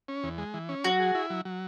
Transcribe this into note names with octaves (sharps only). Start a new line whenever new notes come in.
C#4
E2
G#3
E3
C#4
F#3 F#4
G#4
E4
F#3
F#3